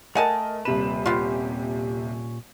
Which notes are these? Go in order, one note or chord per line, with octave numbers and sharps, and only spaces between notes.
A3 A#4 D#5 F#5 G#5 A5
D#1 C3 B4 E7
A#2 B3 C#4 F4 G4